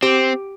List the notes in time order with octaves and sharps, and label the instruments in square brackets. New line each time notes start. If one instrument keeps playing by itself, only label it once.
[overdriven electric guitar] C4 [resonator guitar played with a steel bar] G4